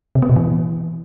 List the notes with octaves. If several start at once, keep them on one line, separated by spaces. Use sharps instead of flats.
C3
B3
B2
E3